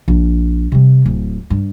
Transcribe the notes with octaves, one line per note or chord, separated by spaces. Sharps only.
A#1
C3 G3
D1
G2